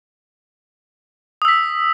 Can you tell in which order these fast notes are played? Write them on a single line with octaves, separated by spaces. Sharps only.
D#6 E6 B6